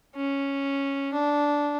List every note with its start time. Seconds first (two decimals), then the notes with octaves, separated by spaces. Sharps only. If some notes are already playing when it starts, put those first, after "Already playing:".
0.16 C#4
1.13 D4